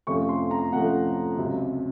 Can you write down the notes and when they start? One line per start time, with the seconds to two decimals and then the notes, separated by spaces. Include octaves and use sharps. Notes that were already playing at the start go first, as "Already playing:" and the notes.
0.07 F2 C3 F3 A3 C#4 C#6
0.29 C6
0.51 A#5
0.72 F2 C3 F3 A3 C#4 F#5
1.38 C#2 C3 F#3